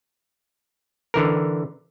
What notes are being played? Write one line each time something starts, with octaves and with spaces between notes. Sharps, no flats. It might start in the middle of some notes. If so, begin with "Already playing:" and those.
D3 E3 A#4